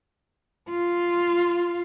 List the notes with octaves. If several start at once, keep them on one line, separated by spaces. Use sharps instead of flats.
F4